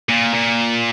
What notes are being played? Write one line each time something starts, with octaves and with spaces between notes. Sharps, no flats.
A#2
A#2